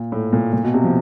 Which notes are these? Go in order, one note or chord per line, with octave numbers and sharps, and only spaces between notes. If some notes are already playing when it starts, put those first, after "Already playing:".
Already playing: A#2
A2
A#2
A#2
B2
C3
F3